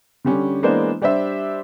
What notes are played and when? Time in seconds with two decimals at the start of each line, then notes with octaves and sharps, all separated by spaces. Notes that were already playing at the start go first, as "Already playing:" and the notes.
0.25 D3 G3 C#4
0.63 E3 G#3 A#3 B3 D4 C5
1.01 G3 D4 G4 C5 E5